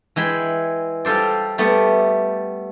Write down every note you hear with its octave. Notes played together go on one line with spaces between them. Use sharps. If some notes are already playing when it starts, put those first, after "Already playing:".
E3 G#3 G5 B5
G3 F4 A4 C5 D5
G3 A3 B3 D5